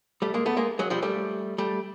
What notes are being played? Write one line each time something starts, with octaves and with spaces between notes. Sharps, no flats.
G3 A3
G#3 A#3
A3 B3
G#3 A#3
F#3 G#3
F3 G3
G3 A3
G3 A3